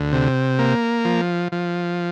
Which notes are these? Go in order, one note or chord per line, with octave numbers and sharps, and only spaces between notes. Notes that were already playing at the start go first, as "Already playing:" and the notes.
Already playing: D2
C3
A#3
F3
F3